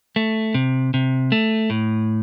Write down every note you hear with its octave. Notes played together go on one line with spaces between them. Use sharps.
A3
C3
C3
A3
A2